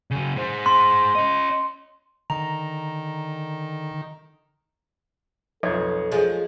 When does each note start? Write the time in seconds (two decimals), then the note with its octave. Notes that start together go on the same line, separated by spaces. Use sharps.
0.11 C#3 F#3
0.36 G#3 C5
0.66 C6
1.15 C#4 D#5
2.30 D3 D#3 A#5
5.63 B1 F2 A4 C#5 G#6
6.12 F3 G#3